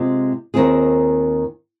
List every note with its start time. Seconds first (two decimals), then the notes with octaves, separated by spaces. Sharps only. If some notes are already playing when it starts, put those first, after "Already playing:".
Already playing: C3 G#3 F4
0.54 D#2 D#3 C4 F4 G#4